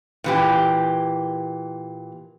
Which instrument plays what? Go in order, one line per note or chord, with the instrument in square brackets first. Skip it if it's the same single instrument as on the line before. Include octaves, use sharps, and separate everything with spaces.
[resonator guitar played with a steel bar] A#2 E3 G4